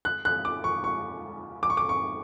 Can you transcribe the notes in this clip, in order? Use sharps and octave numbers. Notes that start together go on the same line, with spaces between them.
F#6
F#6
D6
C#6
C#6
D6
C#6
D6
C#6